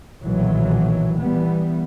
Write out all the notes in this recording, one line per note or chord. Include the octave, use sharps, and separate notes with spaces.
B1 A#2 D#3 E3 F#3
E3 G3 B3